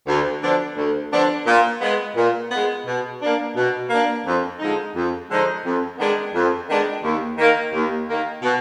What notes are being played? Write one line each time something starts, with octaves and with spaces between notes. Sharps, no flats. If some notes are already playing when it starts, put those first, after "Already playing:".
D2
D3 F3 B3 D4
D2
D3 F3 B3 D4
A#2
G#3 B3
A#2
G#3 B3
B2
A#3 D4
B2
A#3 D4
F2
D3 F3 G#3 D#4
F2
D3 F3 G#3 D#4
F2
D#3 G#3 B3 D4
F2
D#3 G#3 B3 D4
D#2
D#3 A#3
D#2
D#3 A#3
B2